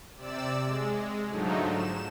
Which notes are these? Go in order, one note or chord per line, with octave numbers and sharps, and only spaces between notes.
C3 D5 E6
G#3
G#2 D3 F3 F#3 A3 D#4
E7